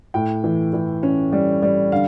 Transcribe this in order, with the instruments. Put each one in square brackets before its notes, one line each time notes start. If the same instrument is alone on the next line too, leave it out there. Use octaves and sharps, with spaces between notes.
[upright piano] A2 G5
E3
E3
C#4
G3
G3
D3 F5